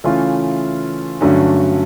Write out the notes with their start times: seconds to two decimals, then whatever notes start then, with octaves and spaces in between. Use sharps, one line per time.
0.04 C#3 E3 A3 C#4 F4
1.21 G2 D3 F#3 A3 C#4